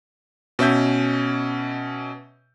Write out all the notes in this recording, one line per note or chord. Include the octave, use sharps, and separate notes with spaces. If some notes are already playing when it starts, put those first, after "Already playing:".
B2 C#4 E5 G6